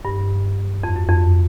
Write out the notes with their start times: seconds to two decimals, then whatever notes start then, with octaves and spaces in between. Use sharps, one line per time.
0.05 G2
0.84 F2
0.96 F#2
1.09 F2